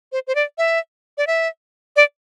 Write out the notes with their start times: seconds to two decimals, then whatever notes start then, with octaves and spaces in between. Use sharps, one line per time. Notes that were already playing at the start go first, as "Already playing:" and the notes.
0.12 C5
0.27 C5
0.35 D5
0.58 E5
1.18 D5
1.27 E5
1.96 D5